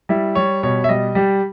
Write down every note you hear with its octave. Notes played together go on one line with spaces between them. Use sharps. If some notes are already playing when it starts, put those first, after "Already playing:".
G3 E4
G3 C#5
B2 C#5
E5
G3 D#5
G3 G4